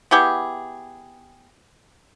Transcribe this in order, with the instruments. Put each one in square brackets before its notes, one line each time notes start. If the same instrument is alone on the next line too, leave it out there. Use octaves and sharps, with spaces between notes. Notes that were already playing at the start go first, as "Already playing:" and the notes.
[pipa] B3 E4 G4 G#4